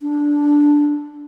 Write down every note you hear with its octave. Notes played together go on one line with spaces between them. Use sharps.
D4